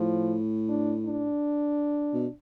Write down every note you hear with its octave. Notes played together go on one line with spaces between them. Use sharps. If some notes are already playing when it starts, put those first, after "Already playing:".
Already playing: A2 F3
D4
D4
B2